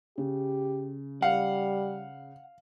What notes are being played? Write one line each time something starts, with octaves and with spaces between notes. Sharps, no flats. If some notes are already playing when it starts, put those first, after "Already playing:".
C#3 G4
G3 F5 F#5